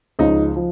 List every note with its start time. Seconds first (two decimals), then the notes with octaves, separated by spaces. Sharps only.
0.19 C#2 C#3 F3 D#4
0.56 F3